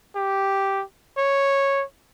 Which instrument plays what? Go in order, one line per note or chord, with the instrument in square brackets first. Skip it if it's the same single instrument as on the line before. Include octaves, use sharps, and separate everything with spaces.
[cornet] G4
C#5